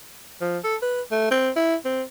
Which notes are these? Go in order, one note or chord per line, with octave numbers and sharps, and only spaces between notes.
F3
A4
B4
A3
C4
E4
C4